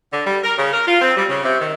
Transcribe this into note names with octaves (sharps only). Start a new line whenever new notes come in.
D3
G3
A#4
C#3
A#4
F4
C4
G3
C#3
C3
D#3